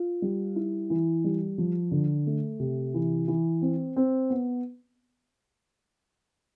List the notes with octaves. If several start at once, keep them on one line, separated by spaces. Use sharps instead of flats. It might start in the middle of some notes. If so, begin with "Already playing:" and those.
Already playing: F4
G3
E4
E3
G3
F3
D3
A3
C3
E3
E3
C4
C4
B3